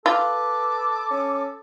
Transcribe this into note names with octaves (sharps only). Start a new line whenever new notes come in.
F4 A4 B4 D6
C#4